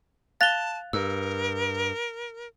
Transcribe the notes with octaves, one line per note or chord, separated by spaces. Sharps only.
F5 A5 F#6 A6 F7 G7
G2 A#4 E6